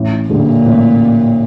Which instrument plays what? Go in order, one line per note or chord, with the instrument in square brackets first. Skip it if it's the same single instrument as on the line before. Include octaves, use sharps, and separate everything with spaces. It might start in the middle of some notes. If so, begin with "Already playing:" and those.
Already playing: [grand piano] A1
[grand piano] G2 D3 G3 [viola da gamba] A#2
[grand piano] A1